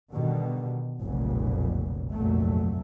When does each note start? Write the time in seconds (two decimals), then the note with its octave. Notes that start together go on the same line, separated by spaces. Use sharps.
0.14 B2 D3 D#3 G3
1.02 F1 B1 F2 A#2 C#3
2.11 F1 B1 G2 A#2 F#3 A3